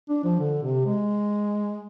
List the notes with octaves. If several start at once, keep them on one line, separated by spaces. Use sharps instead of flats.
D4
F3
D3
C3
G#3